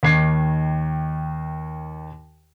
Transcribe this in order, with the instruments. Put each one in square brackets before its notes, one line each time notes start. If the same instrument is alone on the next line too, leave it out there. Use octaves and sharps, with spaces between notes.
[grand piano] D#2 D#3 D6 G#6 C7